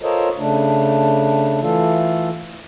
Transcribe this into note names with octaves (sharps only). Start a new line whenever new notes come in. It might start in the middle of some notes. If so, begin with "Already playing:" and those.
F4 A4 A#4 C5 C#5 D#5
C#3 A3 D4
E3 A3 F4 A4